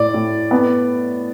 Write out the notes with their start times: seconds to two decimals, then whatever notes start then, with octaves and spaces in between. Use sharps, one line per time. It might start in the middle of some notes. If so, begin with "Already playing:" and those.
Already playing: A2 D5
0.14 A2
0.51 B3